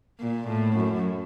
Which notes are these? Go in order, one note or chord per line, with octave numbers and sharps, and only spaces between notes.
A#2
A2
F#2